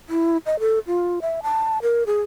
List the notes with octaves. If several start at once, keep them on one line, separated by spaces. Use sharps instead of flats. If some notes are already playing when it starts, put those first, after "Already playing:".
E4
D#5
A4
F4
E5
A5
A#4
G#4